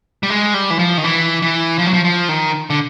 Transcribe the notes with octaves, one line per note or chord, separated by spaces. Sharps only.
G3
G#3
G3
E3
F3
D#3
E3
E3
F3
F#3
F3
F3
D#3
D3